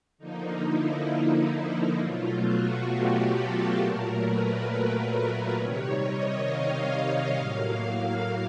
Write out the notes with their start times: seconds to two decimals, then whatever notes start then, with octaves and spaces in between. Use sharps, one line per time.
0.18 D3 F3 A#3 D#4
0.63 E4
1.97 B2 F#3 A3 F4
2.43 F#4
2.88 G4
3.32 A4
3.77 A#2 F#3 A3 A#4
4.21 B4
5.56 C3 D#3 G3 C#5
6.01 D#5
6.46 F5
7.35 A2 F#3 A#3